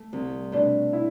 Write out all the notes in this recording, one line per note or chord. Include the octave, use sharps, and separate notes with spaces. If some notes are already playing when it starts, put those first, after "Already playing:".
Already playing: A3
C2 C4
B2 A3 D4
E4